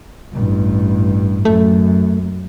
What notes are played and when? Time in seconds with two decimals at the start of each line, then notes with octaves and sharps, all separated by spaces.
0.33 A1 G2
1.45 F#2 A3